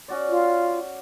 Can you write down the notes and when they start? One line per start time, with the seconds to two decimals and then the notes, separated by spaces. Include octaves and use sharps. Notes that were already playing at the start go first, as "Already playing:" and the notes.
0.08 C#4 F#4 D5
0.29 F4